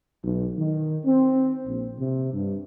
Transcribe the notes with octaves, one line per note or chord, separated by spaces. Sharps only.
B1
D#3
C4
A#1
C3
G2